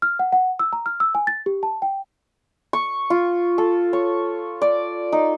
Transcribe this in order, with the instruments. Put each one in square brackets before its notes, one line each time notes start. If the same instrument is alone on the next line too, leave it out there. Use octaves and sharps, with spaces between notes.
[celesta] F6
F#5
F#5
E6
A#5
F6
E6
G#5
A6
G4
A5
G5
[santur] C#6
F4
A4
C#5
D5
D#4